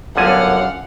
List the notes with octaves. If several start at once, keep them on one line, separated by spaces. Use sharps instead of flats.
G1 F#2 D3 F5 F#5 G#5